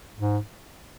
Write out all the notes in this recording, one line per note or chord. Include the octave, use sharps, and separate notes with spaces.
G#2